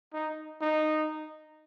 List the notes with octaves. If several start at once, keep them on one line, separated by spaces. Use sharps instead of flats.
D#4
D#4